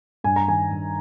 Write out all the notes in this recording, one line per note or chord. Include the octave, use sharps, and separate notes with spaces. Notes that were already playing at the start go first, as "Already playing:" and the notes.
G2 G#5
A#5
D#3 G#5
G2